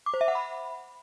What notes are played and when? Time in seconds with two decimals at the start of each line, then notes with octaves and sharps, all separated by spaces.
0.06 D6
0.14 C5
0.21 E5
0.28 F#5
0.35 B5